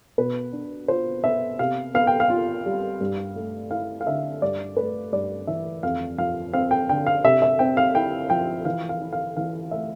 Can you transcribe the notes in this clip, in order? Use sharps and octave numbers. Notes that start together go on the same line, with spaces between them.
B2 B4
D4
F4 C5
B3 E5
C3 F5
B3 F5
G5
F5
F4
G3
G2
A3
E4 F5
F5
D3 E5
G2 D5
A3 B4
G2 D5
E3 E5
F2 F5
F3 F5
C4 F5
G5
D3 G5
F5
C3 E5
E5
C4 G5
F5
E4 G5
F3 G5
E3 F5
F5
E4
F5
E3 F5
A3 E5